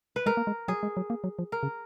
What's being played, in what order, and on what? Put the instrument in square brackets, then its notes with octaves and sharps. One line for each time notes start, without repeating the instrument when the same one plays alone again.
[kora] B4
[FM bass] G#3 [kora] A#4
[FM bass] A#3
G#3
[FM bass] F#3 [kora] G#4
[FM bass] G#3
F#3
A#3
F#3
F3
[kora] A#4
[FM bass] C#3